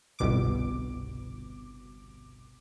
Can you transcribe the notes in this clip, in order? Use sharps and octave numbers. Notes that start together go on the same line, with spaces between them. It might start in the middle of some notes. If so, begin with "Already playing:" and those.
G1 C2 B2 D6